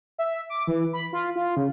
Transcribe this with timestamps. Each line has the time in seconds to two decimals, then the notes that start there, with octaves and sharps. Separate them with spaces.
0.19 E5
0.50 D6
0.67 E3
0.93 B5
1.13 F4
1.36 F4
1.57 C#3